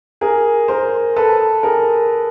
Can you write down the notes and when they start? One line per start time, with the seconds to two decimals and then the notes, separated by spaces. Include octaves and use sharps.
0.21 G#4 A#4
0.68 A#4 C5
1.16 A4 B4
1.63 G#4 A#4